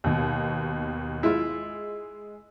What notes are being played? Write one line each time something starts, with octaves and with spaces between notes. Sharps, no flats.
D#2 B2
G#3 E4 F4